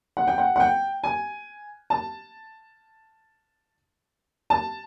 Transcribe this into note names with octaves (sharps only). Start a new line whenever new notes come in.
F#5
G5
F#5
F#5
G5
G#5
A5
A5